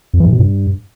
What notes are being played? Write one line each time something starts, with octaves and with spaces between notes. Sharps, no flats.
F2
E3
G#2
B2
G2